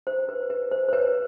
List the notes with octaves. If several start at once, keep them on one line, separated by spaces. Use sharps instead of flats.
C5
B4
B4
C5
C5
B4 C#5